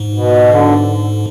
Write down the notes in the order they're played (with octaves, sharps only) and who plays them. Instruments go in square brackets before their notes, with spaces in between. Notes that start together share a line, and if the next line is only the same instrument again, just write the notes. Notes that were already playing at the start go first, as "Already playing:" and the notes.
Already playing: [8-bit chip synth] G#2
[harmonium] B2
D3